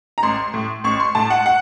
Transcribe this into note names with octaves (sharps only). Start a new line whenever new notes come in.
A#5
A1 C6
A2
A1 C#6
C6
A2 A5
F#5
F#5